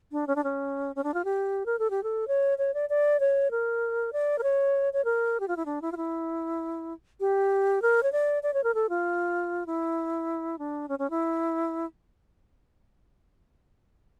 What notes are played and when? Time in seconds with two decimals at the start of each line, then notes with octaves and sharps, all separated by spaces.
0.12 D4
0.27 C#4
0.36 D4
0.44 C#4
0.96 C#4
1.04 D4
1.14 F4
1.25 G4
1.66 A#4
1.79 A4
1.90 G4
2.03 A4
2.28 C#5
2.58 C#5
2.74 D5
2.89 D5
3.20 C#5
3.51 A#4
4.13 D5
4.38 A#4
4.43 C#5
4.93 C#5
5.04 A#4
5.40 G4
5.48 F4
5.57 E4
5.66 D4
5.82 E4
5.92 F4
5.97 E4
7.20 G4
7.82 A#4
8.03 C#5
8.12 D5
8.43 D5
8.54 C#5
8.64 A#4
8.74 A4
8.89 F4
9.66 E4
10.59 D4
10.89 C#4
10.99 C#4
11.10 E4